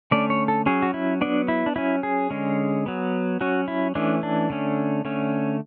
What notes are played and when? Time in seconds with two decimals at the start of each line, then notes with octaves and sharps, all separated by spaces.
0.11 D3 A3 C#4 D5
0.30 C#5
0.48 A4
0.66 F#3 C#4 G#4
0.82 F#4
0.94 E4
1.21 F#3 B3 D4
1.48 E4
1.66 D4
1.76 F#3 C#4 E4
2.03 G#4
2.31 D3 G#3 C#4
2.86 F#3 B3
3.41 F#3 C#4 F#4
3.68 E4
3.95 E3 A3 C#4 D4
4.23 D4
4.50 D3 A3 C#4
5.05 D3 A3 C#4